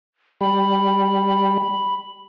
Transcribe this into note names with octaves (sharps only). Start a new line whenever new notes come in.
G3 B5